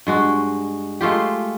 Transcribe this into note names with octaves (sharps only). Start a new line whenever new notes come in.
G2 G#3 F#4
G#3 A3 F4 G4